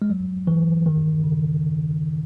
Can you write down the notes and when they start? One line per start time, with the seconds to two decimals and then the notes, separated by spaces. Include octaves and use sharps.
0.02 G#3
0.10 F#3
0.47 E3
0.86 D#3
1.24 C#3